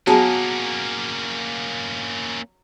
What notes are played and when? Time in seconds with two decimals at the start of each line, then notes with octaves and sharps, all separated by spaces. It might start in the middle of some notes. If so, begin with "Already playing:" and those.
0.07 F#3 A#3 B3 C#4 F#4 G#4 A5